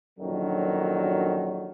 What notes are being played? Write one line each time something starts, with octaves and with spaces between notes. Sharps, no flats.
A#1 F#2 D3 D#3 F#3